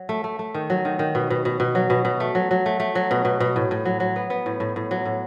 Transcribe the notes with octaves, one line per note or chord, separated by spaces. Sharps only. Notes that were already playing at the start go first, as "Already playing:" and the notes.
Already playing: F#3
A3
A3
A3
D#3
F#3
D#3
D#3
B2
B2
B2
B2
F#3
B2
B2
A3
F#3
F#3
A3
A3
F#3
B2
B2
B2
A2
A2
F#3
F#3
B3
B3
A2
A2
A2
F#3
A2